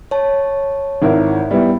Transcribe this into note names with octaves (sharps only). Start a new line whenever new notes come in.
C#5 A5
G#1 E4 A#4
G3 B3 E4